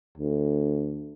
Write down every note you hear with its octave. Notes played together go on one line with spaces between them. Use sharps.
D2